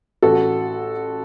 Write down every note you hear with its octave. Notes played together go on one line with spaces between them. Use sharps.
A1 F#4 A4